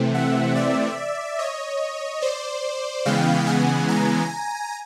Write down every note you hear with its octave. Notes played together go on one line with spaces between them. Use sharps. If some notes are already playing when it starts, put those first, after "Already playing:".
Already playing: C3 E3 A3 C4
E5 F#5
D5 E5
C#5 D#5
C5 D5
C#3 E3 G#3 B3 F5 G5
F#5 G#5
G#5 A#5